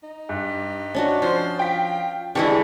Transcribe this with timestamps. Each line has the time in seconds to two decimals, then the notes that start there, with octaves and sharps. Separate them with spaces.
0.03 D#4
0.29 G2
0.94 C#4 D4 F#4
1.22 F3 C5
1.59 F4 G5 B6
2.35 D3 E3 G#3 G4 G#4 B4 D5 C#6